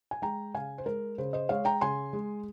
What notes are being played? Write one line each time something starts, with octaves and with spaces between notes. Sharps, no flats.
G#5
G#3 G5 A#5
C#3 F5 G#5
C5
G#3 A#4
C#3 C5
C5 D#5
G#3 C#5 F5
G5 A#5
C#3 G#5 C6
G#3